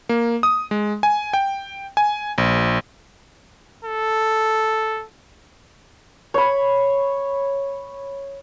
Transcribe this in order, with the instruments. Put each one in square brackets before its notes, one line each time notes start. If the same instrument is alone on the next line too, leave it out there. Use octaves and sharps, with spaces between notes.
[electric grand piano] A#3
D#6
G#3
G#5
G5
G#5
A#1
[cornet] A4
[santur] C#5 B5